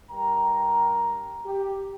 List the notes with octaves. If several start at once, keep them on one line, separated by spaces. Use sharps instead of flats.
G2 A#4 G5 A#5
G4